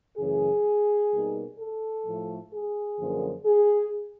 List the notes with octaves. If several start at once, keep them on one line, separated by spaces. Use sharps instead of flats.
F#2 C#3 E3 A3 G#4
B2 G3 A#3 D#4
A4
A2 F3 A3
G#4
F#2 D3 F3 A#3
G#4